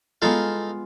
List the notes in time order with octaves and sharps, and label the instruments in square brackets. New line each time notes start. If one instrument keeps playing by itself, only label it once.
[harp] G#3 B3 F4 [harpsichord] D#4 A4 F5